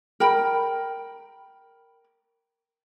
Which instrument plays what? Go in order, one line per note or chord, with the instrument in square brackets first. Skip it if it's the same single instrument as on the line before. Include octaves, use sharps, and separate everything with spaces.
[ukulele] A#4 G5 B5